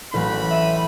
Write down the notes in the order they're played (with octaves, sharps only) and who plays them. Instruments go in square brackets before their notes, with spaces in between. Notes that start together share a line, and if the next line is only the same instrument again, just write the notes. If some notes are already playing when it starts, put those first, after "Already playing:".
[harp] A1 F#3 B4 [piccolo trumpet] B5
[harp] E5 D#7